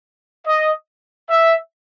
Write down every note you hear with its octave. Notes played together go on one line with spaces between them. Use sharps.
D#5
E5